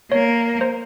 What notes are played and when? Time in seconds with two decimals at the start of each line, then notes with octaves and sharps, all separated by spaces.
0.12 A#3 C#5
0.61 C5